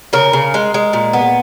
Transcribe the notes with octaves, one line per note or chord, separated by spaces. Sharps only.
C#3 A#4
C#3
G#3
G#3
A#2
B3